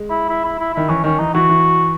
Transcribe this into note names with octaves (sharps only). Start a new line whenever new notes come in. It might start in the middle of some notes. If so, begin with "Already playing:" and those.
Already playing: G#3
E4
E4
E4
E4
D#3 E4
E3 C#4
D#3 C#4
E3 D#4
E3 F#4
E3